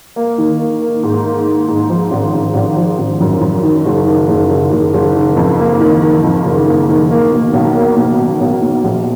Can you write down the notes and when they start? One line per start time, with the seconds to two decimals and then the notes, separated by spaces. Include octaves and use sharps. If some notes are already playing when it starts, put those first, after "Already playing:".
0.16 A#3
0.38 D#3
0.59 A#3
0.81 A#3
1.03 G#2
1.25 A#3
1.47 A#3
1.68 G#2
1.89 F3
2.11 G#1
2.34 G#1
2.55 G#1
2.77 F3
2.99 G#1
3.20 F#2
3.41 F#2
3.63 D#3
3.85 F#1
4.06 D#3
4.28 F#1
4.50 F#1
4.72 F#1
4.94 F#1
5.15 D#3
5.36 F2
5.59 A#3
5.80 D#3
6.02 D#3
6.23 F2
6.45 F#1
6.67 A#3
6.89 D#3
7.11 A#3
7.32 B2
7.53 B1
7.75 A#3
7.97 B2
8.19 B1
8.41 B1
8.62 B2
8.84 A#1